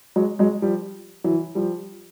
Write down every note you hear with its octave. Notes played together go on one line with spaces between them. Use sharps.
F#3 G#3
F#3 G#3
F3 G3
E3 F#3
F3 G3